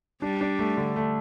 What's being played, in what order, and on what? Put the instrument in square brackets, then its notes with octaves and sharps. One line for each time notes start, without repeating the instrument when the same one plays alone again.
[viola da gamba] G3 [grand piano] D4
[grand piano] D4
A3
D3
A3